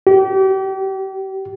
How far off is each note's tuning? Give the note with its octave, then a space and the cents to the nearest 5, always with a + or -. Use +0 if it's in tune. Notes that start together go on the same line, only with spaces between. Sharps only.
G4 -35